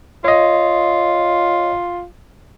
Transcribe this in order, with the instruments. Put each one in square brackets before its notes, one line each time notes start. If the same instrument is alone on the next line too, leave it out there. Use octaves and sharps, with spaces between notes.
[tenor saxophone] F4 [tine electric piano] C#5 D#5